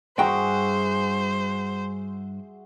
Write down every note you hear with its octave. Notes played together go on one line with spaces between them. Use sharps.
G2 F#4 G#4 C5 E5 G5 A#5